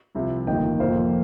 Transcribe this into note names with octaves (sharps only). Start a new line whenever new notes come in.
C2 C3 F3
G1 F2 D#3 A#3 D#5 G5
F1 F2 F3 A#3 C5 F5